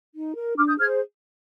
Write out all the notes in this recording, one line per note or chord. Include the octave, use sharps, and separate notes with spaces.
D#4
A#4
D4 D6 F6
D#6 G6
G#4 C5 F6 G#6